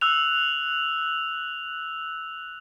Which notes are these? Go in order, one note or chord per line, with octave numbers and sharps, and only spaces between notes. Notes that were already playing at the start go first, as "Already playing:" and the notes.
E6 F#6 F7